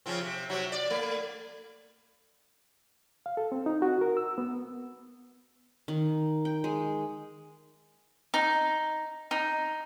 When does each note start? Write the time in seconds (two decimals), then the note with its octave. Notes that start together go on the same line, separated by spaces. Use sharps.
0.06 C#3 F3 C4
0.21 C3
0.50 C3 F#3
0.72 D5
0.90 A3
3.26 F5
3.37 A4
3.52 C4
3.66 D#4
3.82 F#4
4.01 A#4
4.17 E6
4.38 B3
5.88 D#3
6.45 G5
6.64 G#3
8.34 D#4
9.31 D#4